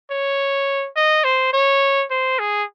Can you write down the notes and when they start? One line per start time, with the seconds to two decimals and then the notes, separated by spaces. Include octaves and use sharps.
0.10 C#5
0.96 D#5
1.24 C5
1.53 C#5
2.10 C5
2.39 G#4